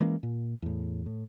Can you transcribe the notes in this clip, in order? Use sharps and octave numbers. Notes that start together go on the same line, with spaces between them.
E3 G#3 A#3 C#4
A#2
E2 A2
A2